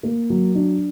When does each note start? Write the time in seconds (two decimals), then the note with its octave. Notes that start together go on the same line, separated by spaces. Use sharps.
0.03 A#3
0.30 F#3
0.55 D4